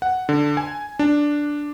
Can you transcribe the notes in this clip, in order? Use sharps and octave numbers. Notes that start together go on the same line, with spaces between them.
F#5
D3
G#5
D4